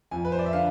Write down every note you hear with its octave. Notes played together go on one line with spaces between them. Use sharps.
F2 G#5
B4
C5
D5
E5
D3 F5